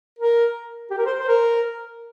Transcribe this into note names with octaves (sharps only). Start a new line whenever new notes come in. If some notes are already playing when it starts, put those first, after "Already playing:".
A#4
G4
A#4
C5
C5
A#4